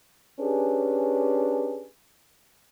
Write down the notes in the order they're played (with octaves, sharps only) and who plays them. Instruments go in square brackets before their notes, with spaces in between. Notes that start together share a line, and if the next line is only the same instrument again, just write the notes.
[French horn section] C#4 D4 G4 G#4 B4